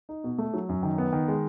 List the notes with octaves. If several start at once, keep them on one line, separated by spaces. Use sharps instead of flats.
D#4
B2
A3
F#3
F#2
D#3
B3
D#3
G#3